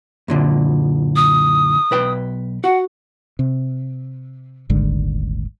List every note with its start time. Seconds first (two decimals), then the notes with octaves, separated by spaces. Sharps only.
0.28 F#2 A#2 D3
1.16 D#6
1.91 B1 B4 G5
2.64 F#4 F#5
3.39 C3
4.69 D#1 G#1 G#2 D3